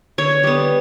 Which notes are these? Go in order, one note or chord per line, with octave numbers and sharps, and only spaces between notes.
D3 C#5
G3 B3